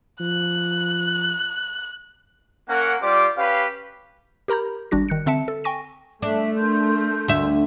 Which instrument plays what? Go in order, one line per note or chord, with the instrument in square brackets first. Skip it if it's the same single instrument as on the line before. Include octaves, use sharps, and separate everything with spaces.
[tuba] F3 [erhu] F#6
[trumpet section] A#3 C#4 A#4 F#5
G3 F4 G4 C5 D5 D6
C#4 G4 B4 F5
[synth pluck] G4 A#4 A#5 B5 G6
G#1 G3 D4 F#4 A#6
D#3 F#6 C#7
D3 C4 E5 A5 C#7
A4
G5 G#5 C#6 A#6 D#7
[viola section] A3 [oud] D4 [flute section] E5
[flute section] A#4 C6 G6
[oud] D2 E5